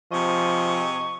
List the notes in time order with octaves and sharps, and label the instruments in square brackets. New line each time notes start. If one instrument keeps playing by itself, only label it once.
[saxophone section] C3 G#4 D#5 [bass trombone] F3 [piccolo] C#6